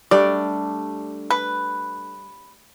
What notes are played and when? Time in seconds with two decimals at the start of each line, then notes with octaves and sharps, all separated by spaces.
0.11 G3 A3 D4 D5
1.30 B4